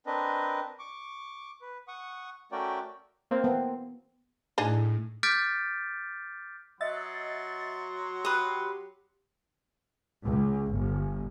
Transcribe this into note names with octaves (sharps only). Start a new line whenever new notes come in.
C4 D4 A#4 B4 D#5
C#6 D6
B4
F#5 C#6 D#6
A3 C#4 F#4 A#4 D5 G5
A#3 C4
B3
A2 D4 D#4 G#4
D6 F6 G6 A6 B6 D7
F#3 D#5 E5 F#5 C6 A6
G4 B4 D#6
C#2
G1